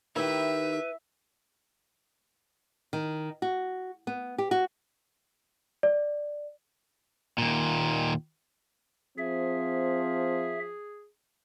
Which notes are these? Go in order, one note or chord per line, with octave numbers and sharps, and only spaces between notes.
D#3 D#4 E4 G4 B4 E5
D#3
F#4
B3
G4
F#4
D5
D#2 A#2
F3 C4 G#4 E5